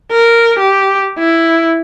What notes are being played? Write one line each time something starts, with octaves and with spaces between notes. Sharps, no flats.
A#4
G4
E4